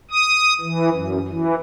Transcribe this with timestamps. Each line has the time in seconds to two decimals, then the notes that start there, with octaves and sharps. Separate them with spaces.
0.11 D#6
0.61 E3
0.93 F#2
1.28 E3